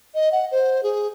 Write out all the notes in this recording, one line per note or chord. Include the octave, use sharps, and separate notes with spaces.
D#5
F#5
C5
G#4